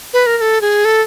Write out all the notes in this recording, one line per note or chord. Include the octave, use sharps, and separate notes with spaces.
B4
A#4
A#4
A4
G#4
A4